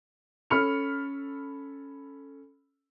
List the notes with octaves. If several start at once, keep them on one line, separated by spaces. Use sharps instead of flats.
C#4 A4 B5 F6 C#7 F7